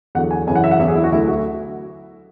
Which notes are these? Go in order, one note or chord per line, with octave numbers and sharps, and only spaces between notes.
E2 D3 F#3 F#5
G#5
F#2 C#3 E3 G#5
F#5
E5
F#5
E2 D3 F#3 E5
G#4
E4
F#4
D2 D3 F#3 E4
F#4